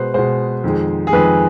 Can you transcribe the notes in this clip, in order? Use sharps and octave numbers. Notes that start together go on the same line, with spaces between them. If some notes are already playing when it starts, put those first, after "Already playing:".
Already playing: B2 G#3 B4 C5
B2 G#3 C5
F2 D#3 G#3
G#4
F2 D#3 G#3 B4